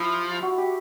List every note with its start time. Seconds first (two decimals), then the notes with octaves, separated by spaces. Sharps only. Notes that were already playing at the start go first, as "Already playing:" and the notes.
Already playing: F3 E4 G4
0.42 F#4
0.58 G4